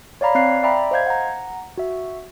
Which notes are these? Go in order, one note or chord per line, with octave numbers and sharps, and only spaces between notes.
C#5 D5 F5 A#5 B5
C4 D5 F5 F#6 C7
D5 E5 G5 A#5 B5
C5 D#5 F5 G6 G#6
F#5 A#5
F#4 E5